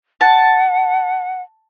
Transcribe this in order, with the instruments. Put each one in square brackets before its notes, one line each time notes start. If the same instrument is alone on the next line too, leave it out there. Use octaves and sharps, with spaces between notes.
[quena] F#5 [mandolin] A5